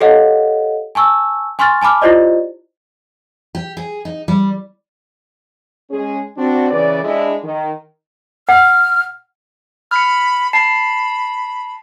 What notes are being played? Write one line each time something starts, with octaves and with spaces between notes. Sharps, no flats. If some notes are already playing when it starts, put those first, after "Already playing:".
G4 A4 C#5 D#5 F5 F#5
G#5 A5 C#6 E6
G#5 C6 C#6 F6 A6
G#5 A5 B5 D6 F6
E4 F4 G4 C5 D5 D#5
G4
G#4
D#4
G3
G#3 C#4 G#4
C4 D4 F#4
C#3 E3 B4 D5
G#3 D4 E4
D#3
F#5 F6
B5 F6 C#7
A5 B5 C7